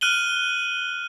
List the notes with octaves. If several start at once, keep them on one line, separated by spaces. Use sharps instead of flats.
F6 F#6 D#7 F#7 G7